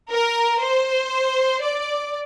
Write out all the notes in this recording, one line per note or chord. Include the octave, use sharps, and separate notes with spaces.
A#4
C5
D5